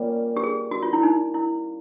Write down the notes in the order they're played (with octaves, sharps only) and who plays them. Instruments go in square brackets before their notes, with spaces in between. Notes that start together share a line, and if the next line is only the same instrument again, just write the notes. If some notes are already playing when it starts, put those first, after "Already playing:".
Already playing: [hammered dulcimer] A#2 G3 A#3 C#4
[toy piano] G4
G#4
F#4
F4
E4
D#4
E4